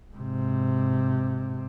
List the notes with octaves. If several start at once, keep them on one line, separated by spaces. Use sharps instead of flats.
G#2 C3